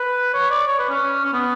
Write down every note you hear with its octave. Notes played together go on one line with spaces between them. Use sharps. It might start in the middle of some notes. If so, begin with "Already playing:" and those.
Already playing: B4
C#5
D5
C#5
B4
C#4
C#4
B3